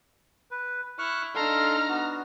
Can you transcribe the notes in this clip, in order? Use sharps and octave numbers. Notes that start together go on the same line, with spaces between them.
B4
E4 C#6 F6 F#6
D4 D#4 A4 F5 A#5 C6 F6
B3 F#4